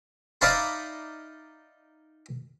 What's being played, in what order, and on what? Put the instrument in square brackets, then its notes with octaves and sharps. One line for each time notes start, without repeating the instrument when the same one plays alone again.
[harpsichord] D#4 D5 E5 F5 A5 B5